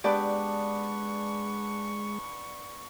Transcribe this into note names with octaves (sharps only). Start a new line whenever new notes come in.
G#3 B3 D4 G4 B4 D5 C#6